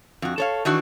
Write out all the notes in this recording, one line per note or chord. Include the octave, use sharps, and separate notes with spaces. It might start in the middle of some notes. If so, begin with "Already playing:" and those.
F2 F#4
A4 C#5 F5
D#3 E3 D4 F#4